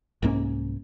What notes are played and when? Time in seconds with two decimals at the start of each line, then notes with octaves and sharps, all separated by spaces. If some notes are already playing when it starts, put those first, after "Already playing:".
0.22 C2 G#2 A#3 C#4